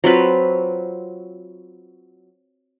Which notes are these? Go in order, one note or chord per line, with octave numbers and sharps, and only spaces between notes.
F#3 C4 F4 B4